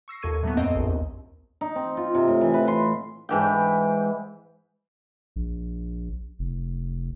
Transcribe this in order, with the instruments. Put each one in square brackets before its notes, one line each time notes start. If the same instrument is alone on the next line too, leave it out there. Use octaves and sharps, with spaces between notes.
[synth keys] C#6 E6 A#6 C7
D#2 F4 A4 C#6 G#6 D#7
A2 F#3 A#3 B3
F2 C4 C#5 D#5
A#1 F#2
D#2
[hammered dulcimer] D#4
C4
F4
C3
A2
E3
B4
C6
G#2 E3 G5
[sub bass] A#1
F1